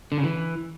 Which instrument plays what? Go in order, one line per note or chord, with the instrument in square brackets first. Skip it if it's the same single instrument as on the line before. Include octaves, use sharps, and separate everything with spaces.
[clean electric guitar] D3
C#3
E3